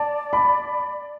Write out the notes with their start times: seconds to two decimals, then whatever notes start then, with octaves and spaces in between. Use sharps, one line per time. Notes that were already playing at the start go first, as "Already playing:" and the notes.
Already playing: D5 A5
0.33 B5